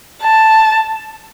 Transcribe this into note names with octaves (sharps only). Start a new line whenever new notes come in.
A5